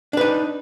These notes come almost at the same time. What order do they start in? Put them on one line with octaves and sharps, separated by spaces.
D4 B4 D#4